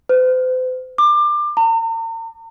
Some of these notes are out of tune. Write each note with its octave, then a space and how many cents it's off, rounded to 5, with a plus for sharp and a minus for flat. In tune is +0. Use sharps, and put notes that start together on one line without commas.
C5 -40
D6 +25
A#5 -45